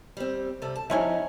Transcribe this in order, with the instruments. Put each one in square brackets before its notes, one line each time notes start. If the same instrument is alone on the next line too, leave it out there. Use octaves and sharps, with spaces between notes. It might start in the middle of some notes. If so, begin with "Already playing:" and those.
[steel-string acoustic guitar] G3 C4
C3 G3 A4
A5
[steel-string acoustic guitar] F3 C#4 D#4 [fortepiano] E4 C#5 G#5